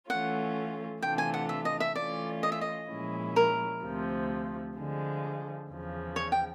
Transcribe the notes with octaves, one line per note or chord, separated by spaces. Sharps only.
E3 A3 C#4 F4 F#5
C3 E3 A3 D4 F4 G5
G#5
F#5
E5
D#5
E5
E3 A3 C#4 F4 D5
D#5
E5
D#5
A#2 F3 G#3 C#4 E4
A#4
D2 C3 F3
D3 F3 G#3
E2 C#3 F3
C#5
G5